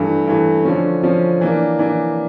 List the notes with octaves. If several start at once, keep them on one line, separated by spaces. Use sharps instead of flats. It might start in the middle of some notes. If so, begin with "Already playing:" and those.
Already playing: G2 E3 A3
G2 E3 A3
D3 F3 C#4
D3 F3 C#4
E3 A#3 D4
E3 A#3 D4